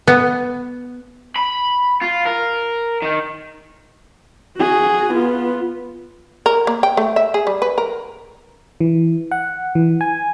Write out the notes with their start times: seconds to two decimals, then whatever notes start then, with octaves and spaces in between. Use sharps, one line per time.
0.08 B3
1.36 B5
2.02 F4
2.26 A#4
3.02 D#3
4.58 F#4 G#4
5.12 B3 F4
6.46 A#4
6.67 A#3
6.83 G5
6.97 A3
7.16 E5
7.34 G#4
7.47 G3
7.62 B4
7.78 A#4
8.80 E3
9.31 F#5
9.75 E3
10.01 G#5